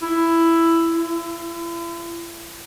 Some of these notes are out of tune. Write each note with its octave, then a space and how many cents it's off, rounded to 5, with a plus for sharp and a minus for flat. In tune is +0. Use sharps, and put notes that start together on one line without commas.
E4 +10
E4 +40